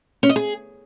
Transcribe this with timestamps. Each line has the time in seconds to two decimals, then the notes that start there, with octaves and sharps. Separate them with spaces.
0.23 C#4
0.29 D#5
0.36 G#4